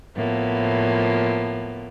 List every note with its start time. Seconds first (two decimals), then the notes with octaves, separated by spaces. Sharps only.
0.17 A2 F3 A#3 B3